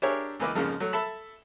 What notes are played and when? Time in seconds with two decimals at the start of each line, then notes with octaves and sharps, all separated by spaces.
0.02 D4 G4 G#4 A#4 C#5 E5
0.40 C#2 E3 A#3 B4 D#5 D6
0.55 F2 G#2 C#3 F3 A#3
0.80 F#3 A3
0.93 A4 E5 A5 B5